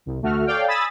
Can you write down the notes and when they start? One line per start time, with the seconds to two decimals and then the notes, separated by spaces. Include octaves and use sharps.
0.06 C2
0.21 D2 A3 F#4 F6
0.46 A4 C#5 D5 F5 G5
0.68 G#5 B5 D#6 E6 A6